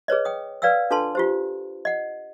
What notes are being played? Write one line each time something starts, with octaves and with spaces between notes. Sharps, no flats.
G#4 B4 C#5 D#5
G5 D#6
B4 D5 F5 G5 E6
D4 F4 A4 B4 A5 C6
F4 G4 C5
D#5 F#5